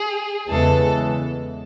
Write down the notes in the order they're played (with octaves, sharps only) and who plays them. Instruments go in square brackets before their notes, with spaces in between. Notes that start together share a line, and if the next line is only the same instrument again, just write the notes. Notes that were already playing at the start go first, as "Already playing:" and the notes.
Already playing: [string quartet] G#4
[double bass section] E2 C#3 E3 G#3 B3 [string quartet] A4